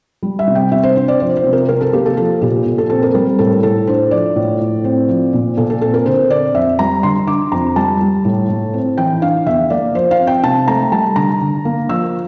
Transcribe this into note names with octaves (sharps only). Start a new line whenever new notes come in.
G3
E5
C3
G5
C3 E5
C5
D4 C5
D5
F3 C5
C5
C3
A#4
C3 A#4
A4
A#3 G4
A4
F3 A4
A#2 G4
A#2
A4
C4 A4
A#4
G3 A#4
A2 A4
A2 A4
D4 C5
F3 D5
A2
A2
C4
F3
A#2
A#2 A4
A4
C4 A4
A#4
D3 C5
C4 D5
F2 E5
G3 A#5
D3 C6
D4 D6
F2 A#5
G3 A5
G3
A2
A2
C4
E3 G5
D4 F5
E2 E5
A#3 D5
F3 C5
F5
C4
G5
C3 A5
A3 A#5
G3 A5
D3 A#5
D3
A#3
F3 E6